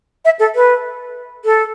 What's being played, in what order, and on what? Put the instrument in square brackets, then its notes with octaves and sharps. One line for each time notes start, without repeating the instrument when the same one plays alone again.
[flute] E5
A4
B4
A4